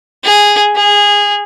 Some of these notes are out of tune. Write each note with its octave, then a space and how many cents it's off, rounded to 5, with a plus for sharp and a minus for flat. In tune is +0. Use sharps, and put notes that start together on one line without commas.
G#4 -5
G#4 -20